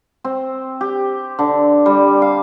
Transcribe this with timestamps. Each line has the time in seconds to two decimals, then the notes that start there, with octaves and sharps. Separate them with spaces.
0.24 C4
0.81 G4
1.39 D3
1.86 G3
2.22 F5